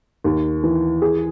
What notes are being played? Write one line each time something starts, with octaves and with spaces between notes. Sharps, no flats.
D#2
E3
G#4